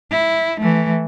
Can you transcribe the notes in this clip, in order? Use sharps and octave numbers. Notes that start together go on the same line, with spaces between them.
E4
E3 A3